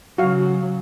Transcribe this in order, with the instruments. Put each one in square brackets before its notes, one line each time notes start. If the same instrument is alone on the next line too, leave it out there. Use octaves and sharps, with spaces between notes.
[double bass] C#3 F#3 [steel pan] F#4 F5